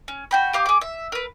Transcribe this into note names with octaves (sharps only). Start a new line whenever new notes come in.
C#4
F#4 G5 B5
G4 F5 D6 D#6
G#4 D6
E5
A#4 B4